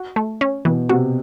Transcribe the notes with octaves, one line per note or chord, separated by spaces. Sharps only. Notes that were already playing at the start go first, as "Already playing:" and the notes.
Already playing: F#4
A3
C#4
B2 E3
C3 F#4